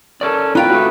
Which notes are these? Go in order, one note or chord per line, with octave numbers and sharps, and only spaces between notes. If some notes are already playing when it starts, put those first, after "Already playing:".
C#4 A4 A#4 D5
D#4 F4 B4 G5
A3 F#4